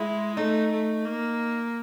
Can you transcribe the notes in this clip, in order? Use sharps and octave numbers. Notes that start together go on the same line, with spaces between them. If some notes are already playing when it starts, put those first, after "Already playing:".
Already playing: G#3 E4
A3 D#4
A3
A#3